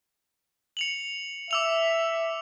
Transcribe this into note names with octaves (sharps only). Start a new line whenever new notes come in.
C#7 F7 F#7
E5 D6 E6 F7